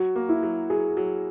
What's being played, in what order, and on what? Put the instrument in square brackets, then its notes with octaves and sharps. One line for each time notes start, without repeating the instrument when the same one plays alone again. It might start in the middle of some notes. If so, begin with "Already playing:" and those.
Already playing: [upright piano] F#3 [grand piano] F#4
[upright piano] A#3
[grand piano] E4
[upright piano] F#3
[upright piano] F#3 [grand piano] G#4
[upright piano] F#3